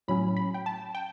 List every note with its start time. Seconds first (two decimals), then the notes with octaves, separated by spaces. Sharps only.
0.08 A2 F#3 C#4 B5
0.37 B5
0.54 G5
0.66 A5
0.95 G5